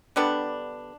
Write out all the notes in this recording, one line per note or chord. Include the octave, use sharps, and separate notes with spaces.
D3 G3 B3 D4